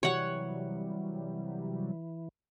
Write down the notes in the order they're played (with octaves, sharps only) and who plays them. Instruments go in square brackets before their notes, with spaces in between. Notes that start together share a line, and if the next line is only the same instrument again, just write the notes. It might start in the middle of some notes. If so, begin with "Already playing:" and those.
[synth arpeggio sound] C3 F#3 G3 [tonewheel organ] E3 [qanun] C#5 F#5